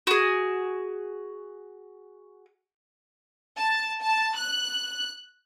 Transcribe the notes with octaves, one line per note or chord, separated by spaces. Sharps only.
F#4 G#4
A5
A5
F#6